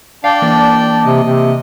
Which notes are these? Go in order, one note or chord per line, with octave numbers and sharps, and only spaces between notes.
D4 D5 F5 G5
E3 A#3 A#4
C3 D#5
C3